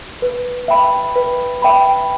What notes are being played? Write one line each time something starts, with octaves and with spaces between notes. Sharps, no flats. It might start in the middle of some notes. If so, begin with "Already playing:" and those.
B4
E5 G5 B5
B4
E5 G5 B5